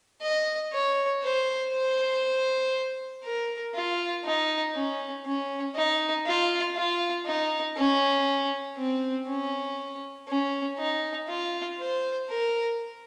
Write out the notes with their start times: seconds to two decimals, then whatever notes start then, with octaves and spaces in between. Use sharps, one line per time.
0.22 D#5
0.73 C#5
1.23 C5
1.73 C5
3.24 A#4
3.75 F4
4.25 D#4
4.75 C#4
5.25 C#4
5.76 D#4
6.26 F4
6.76 F4
7.26 D#4
7.77 C#4
8.77 C4
9.28 C#4
10.28 C#4
10.79 D#4
11.29 F4
11.79 C5
12.29 A#4